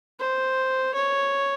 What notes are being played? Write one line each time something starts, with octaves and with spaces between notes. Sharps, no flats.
C5
C#5